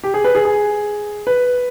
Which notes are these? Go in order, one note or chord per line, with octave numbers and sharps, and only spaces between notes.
G4
G#4
B4
G#4
G#4
B4